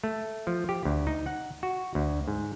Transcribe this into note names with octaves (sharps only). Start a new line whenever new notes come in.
A3
F3
G4
D2
D#4
F#5
F#4
D2
G#2